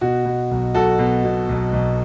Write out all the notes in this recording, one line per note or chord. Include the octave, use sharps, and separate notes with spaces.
B2 F#4
B2
B1
B1 F#4 A4
B2
B2
B1
B1